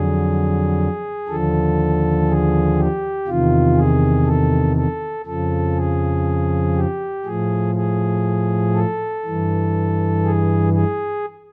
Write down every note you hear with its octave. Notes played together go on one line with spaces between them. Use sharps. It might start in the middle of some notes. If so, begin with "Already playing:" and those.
Already playing: F2 D3 F#3 G#4
D#2 D3 F3 A4
G#4
G4
E2 C3 D#3 F4
G#4
A4
A4
F2 C#3 F3 A4
G#4
G4
A2 F3 G#4
G#4
A4
G2 E3
G#4
G#4